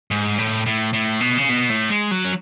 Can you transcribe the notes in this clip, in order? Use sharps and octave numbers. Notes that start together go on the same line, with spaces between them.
G#2
A2
A2
A2
B2
C#3
B2
A2
G#3
F#3
C#4